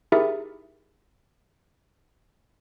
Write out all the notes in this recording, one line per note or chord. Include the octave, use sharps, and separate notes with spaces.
D#4 E4 G4 G#4 A#4 E5